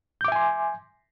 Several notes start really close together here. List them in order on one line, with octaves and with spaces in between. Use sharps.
G6 D6 E5 G#5 C6